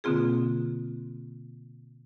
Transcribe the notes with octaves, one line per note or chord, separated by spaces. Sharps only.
B2 D3 A#3 C4 F4 G#4